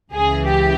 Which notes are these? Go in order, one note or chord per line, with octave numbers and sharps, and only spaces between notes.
C#2 C#3 E3 G#4
G4